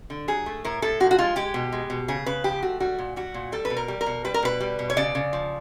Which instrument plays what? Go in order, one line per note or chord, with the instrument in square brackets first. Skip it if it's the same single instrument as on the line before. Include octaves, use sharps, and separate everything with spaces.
[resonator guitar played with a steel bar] D3
F#3 G#4
A3
A2 A#4
A2 A4
F3 F#4
F#4
G#3 F4
G#3 G4
B2
G#3
B2
C#3 G#4
C#3 B4
F3 G4
A3 F#4
G3 F#4
A#2
G3 F#4
A#2
G3 A4
B4
B2
A#4
G3
A#4
B2
G3 B4
A#4
B2 B4
G3
B2
C#5
C#3 D5
C#3
F3